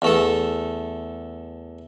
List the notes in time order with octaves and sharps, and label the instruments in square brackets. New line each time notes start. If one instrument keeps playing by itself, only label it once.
[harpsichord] E2 A3 A4